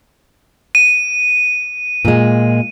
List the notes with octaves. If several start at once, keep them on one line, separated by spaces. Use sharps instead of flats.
D#7
A#2 G#3